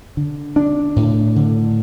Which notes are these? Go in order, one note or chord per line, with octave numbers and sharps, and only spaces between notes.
D3
D4
A2
D3